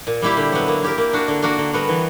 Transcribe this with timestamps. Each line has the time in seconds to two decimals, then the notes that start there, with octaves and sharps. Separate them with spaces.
0.07 A#2
0.22 G3 A#3 E4 G4
0.37 D3
0.52 F#3 B3
0.68 A#3
0.83 E4 G4 A#4
0.98 A#3
1.13 D4 F#4 A#4
1.28 D3
1.42 A#3 D4 F#4 A#4
1.58 D3
1.73 G3 B3 F#4 A#4
1.89 E3